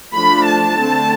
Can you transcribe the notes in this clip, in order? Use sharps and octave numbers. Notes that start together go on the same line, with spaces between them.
F3 A3 D4 B5
A5
D3 A3 C4